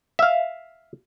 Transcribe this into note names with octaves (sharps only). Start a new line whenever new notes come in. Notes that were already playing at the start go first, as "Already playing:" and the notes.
E5 F5